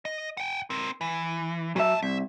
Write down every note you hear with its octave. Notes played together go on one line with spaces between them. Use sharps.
D#5
F#5 G5
C4 A#4
E3
A#2 F#3 E5 A5
C2 E5